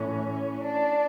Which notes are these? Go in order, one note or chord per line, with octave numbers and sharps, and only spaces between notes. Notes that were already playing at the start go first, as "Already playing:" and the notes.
Already playing: A2 E3 C#4
D4